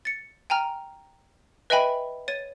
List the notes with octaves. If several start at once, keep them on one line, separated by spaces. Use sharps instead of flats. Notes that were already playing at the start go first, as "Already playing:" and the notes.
A6 C#7
G5 G#5 A#5 F6
B4 D#5 E5 G5 G#5 B5
C#5 A6 D#7